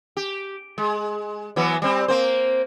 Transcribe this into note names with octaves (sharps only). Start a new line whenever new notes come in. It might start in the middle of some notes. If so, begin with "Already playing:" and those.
G4
G#3
E3 F#3 B3
G3 C4
A#3 C4 C5